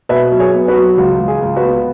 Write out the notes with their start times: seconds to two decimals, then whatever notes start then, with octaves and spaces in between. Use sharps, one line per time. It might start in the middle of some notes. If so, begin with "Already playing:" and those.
0.09 B2 B4 E5
0.31 F#3
0.39 G#4 C#5
0.54 B3
0.68 F#4 B4
0.76 F#3
0.98 C#2 F#4
1.20 C#2
1.28 G#4
1.42 C#2
1.56 F#4 B4
1.64 B3